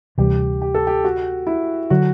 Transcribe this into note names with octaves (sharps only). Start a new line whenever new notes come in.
D2 C3 E3 G3 G4
G4
A4
G4
F#4
E4
D3 F#3 F#4